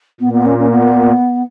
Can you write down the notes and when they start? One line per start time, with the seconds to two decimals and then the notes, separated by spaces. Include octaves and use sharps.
0.20 A#2 B3
0.33 B3
0.45 C#4
0.58 C#4
0.71 B3